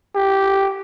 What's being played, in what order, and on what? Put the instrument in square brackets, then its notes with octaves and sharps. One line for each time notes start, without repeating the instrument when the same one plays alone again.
[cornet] G4